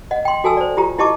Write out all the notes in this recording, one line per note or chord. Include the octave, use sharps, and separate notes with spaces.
D#5 F#5
G5 C6
F#4 A4 G#5 A5 E6
C5 D5
F4 G4 A#5
E4 G4 D#5 A5 C#6 D6